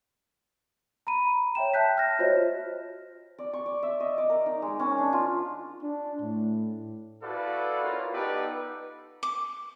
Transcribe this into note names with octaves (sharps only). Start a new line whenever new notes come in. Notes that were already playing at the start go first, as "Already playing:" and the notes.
A#5 B5 D#7
C#5 E5 G5 E7
E5 G5 A5 F#6 G6 B6
F6 A#6
F4 F#4 C5 C#5 D#5 E5
D5
C#6
D5
E5
D#5
D5
A#4
D#4
G#3
C#4
D4
F4
D4
A2
E4 F#4 A4 B4 D5 F5
A#3 C#4 F4
B3 D#4 G4 A4 B4 D5
D6